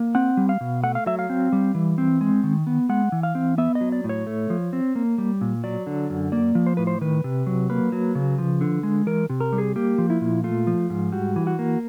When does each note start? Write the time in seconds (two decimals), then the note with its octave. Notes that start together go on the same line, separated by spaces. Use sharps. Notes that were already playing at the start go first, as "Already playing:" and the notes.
Already playing: A#3
0.15 C4 F#5
0.37 G3
0.49 F5
0.61 B2
0.83 A3 F#5
0.95 F5
1.06 F#3 E5
1.19 F5
1.30 C4
1.53 G3
1.75 E3
1.98 C4
2.21 G#3
2.44 D#3
2.67 B3
2.89 G#3 F#5
3.12 E3
3.23 F5
3.35 C4
3.58 B3 E5
3.75 D#5
3.81 F#3
3.92 D5
4.04 A2
4.09 C#5
4.27 A3
4.50 F3
4.73 C4
4.95 A#3
5.18 G3
5.41 A#2
5.64 F#3 D5
5.87 D3
6.10 F#2
6.32 A#3 D5
6.55 F3
6.66 C5
6.77 A2 B4
6.87 C5
7.01 D#3 B4
7.24 C3
7.47 F#3
7.70 A#3 B4
7.92 F#3
8.15 C#3
8.38 F3
8.61 D3
8.83 G#3
9.06 E3 A#4
9.30 C3
9.40 A#4
9.53 G3
9.58 G#4
9.76 A#3 G4
9.98 F3
10.10 E4
10.21 A#2
10.44 A3 F4
10.67 F3
10.90 G#2
11.12 G3 F#4
11.36 E3
11.47 F#4
11.59 A#3